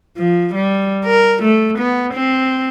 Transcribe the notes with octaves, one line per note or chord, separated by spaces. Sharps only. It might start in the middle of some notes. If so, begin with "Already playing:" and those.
F3
G3
A#4
A3
B3
C4